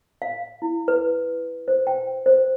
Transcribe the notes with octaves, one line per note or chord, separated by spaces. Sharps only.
F5
E4
B4
C5
G5
C5